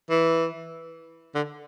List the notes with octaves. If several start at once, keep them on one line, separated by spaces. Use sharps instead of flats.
E3
D3